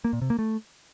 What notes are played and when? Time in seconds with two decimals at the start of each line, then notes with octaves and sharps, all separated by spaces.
0.04 A#3
0.13 A#2
0.21 C3
0.30 A#3
0.39 A3